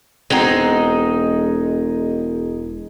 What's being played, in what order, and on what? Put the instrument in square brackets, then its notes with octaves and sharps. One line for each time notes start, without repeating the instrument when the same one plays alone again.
[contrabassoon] E1 [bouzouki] G#3 D#4 [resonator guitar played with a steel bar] B3 C4 F#4